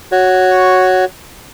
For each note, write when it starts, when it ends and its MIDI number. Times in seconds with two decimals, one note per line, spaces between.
0.12 1.05 66
0.12 1.05 73